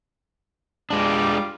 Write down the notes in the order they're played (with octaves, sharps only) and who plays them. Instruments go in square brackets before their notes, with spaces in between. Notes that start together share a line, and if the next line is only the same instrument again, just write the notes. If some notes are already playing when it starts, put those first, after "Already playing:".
[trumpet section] G3 F4 D6 [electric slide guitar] G#3 D4